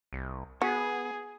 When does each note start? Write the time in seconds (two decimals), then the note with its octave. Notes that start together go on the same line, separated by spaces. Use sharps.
0.13 C2
0.62 B3 F#4 G#4